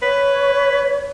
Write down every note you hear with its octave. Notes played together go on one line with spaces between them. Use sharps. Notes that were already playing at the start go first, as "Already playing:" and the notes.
B4 C#5